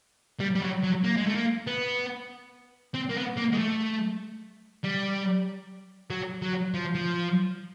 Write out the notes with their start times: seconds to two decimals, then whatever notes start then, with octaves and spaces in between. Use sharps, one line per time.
0.40 G3
0.55 G3
0.62 F#3
0.83 F#3
1.04 A#3
1.16 G#3
1.26 A3
1.35 A#3
1.67 B3
2.94 C4
3.09 A#3
3.15 B3
3.37 A#3
3.52 G#3
3.57 A3
4.84 G3
6.11 F#3
6.42 F#3
6.74 F3
6.95 F3